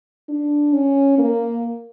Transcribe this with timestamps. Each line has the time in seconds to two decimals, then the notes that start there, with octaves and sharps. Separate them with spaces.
0.29 D4
0.73 C#4
1.19 A#3